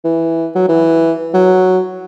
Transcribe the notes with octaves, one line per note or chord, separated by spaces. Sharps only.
E3
F#3
E3
F#3